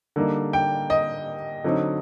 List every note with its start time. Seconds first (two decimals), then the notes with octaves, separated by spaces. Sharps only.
0.16 D3 G3 A#3 D#4
0.53 G5
0.90 D#5
1.64 D3 F#3 C4 D#4